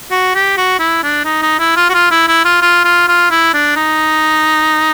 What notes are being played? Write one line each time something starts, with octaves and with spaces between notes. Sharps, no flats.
F#4
G4
F#4
E4
D4
D#4
D#4
E4
F4
F#4
F4
E4
E4
F4
F4
F4
F4
E4
D4
D#4